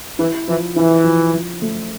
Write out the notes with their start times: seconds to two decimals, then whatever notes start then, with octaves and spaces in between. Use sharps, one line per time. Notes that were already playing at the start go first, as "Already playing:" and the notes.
0.19 E3 E4
0.48 E3 F3
0.76 E3 E4
1.04 F3
1.34 F3
1.62 A3